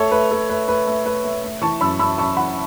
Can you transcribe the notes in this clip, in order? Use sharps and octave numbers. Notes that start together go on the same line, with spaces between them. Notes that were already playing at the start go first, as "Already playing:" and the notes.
Already playing: A3 A4 C#5
A3 B4
A3 A4
A3 B4
A3 B4
A3
A3 B4
A3
A3
E3 A5 C#6
F#2 B5 E6
F#2 B5 E6
F#2 A5 C#6
E3 F#5 B5